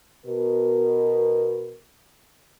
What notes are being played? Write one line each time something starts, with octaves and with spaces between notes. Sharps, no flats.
B2 A#4